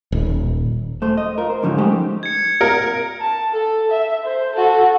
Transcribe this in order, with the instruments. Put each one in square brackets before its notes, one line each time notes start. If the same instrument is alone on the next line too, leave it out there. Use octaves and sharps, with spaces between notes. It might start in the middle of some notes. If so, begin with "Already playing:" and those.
[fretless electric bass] D#1
[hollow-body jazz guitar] A3 C5
D#5
F4 A#4
C5
G#2 D3 D#3 F3 C4 C#4
G#3 A3 D#4 G4 C5
[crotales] G#6 C#7
[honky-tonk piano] A#4
[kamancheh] A5
A4
E5
C5
F#4 A4